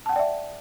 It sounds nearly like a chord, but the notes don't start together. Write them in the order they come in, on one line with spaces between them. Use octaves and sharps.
A5 F#5 G5 D5 E5